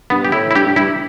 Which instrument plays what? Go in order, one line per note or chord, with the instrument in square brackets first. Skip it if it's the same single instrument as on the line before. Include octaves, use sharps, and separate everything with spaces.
[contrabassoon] G2 [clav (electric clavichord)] B3
[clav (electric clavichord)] G4
[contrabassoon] A2 [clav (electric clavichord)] E4
[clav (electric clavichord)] E4
[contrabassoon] G2 [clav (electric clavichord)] G4
[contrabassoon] G2
[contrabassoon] G2 [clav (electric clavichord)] E4